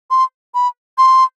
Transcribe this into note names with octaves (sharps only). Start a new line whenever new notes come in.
C6
B5
C6